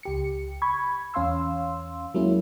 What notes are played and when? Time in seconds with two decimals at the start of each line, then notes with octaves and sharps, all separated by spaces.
0.03 C#2 G4 C#7
0.62 B5 C#6 G#6
1.14 E2 C#4 F5 C6 E6
2.14 F#3 G#3 A#3 C#4 E4